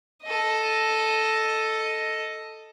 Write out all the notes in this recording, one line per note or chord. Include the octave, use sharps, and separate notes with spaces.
A4 D#5